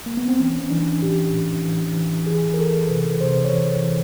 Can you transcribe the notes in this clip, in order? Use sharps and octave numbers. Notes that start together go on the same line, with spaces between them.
A#3
B3
C4
E3 C#4
E3 D4
A2 G4
A2
E3
E3
E3 G#4
A#4
E3 A4
C3 B4
C3 C5
C#5
E3
E3